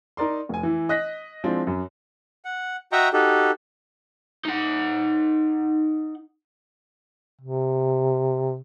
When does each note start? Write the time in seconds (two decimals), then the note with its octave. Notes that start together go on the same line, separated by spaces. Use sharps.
0.17 D#4 A#4 D5 C6
0.49 F1 G#5
0.63 E3 E4
0.89 D#5 F#6 A#6 B6
1.44 F3 G#3 C4 D4 E4
1.67 F#2
2.45 F#5
2.92 F#4 D#5 E5 G5 A#5 C#6
3.13 D#4 F#4 G4 A4
4.45 D#4 F#5
7.41 C3